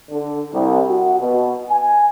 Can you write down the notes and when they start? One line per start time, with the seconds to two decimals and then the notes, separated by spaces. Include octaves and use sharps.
0.10 D3
0.53 C2
0.87 F#4
1.19 B2
1.69 G#5